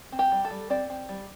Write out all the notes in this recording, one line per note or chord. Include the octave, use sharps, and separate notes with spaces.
C4
G4
G3
A4
G3
C4 D5
C4
G3